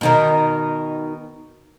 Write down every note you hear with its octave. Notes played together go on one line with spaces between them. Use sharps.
B2 D#3 D#4